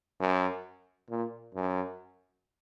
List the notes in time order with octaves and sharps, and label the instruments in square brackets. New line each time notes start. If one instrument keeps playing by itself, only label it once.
[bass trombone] F#2
A#2
F#2